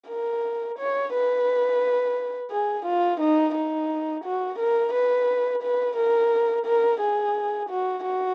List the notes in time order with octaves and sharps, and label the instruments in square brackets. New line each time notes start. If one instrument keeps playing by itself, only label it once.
[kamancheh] A#4
C#5
B4
G#4
F4
D#4
D#4
F#4
A#4
B4
B4
A#4
A#4
G#4
F#4
F#4